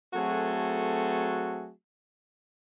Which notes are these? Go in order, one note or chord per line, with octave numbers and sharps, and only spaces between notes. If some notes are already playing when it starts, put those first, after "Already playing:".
F#3 A3 C4 F#4 G#4 A4